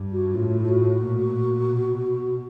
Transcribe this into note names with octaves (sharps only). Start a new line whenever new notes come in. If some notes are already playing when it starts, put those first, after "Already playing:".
Already playing: G2
F#4
A2 F4
F4
F#4
A#2
B2